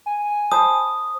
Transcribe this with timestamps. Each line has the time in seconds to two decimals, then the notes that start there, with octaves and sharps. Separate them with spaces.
0.06 G#5
0.52 C5 A5 B5 D#6